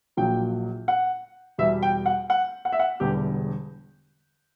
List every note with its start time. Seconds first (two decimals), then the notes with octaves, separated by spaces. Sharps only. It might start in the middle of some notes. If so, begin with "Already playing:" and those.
0.17 A#1 A#2 F#3 G5
0.88 F#5
1.58 E2 B2 G3 E5
1.83 G5
2.06 F#5
2.30 F#5
2.65 F#5
2.72 E5
2.80 F#5
3.00 E1 E2 D3 G3 G4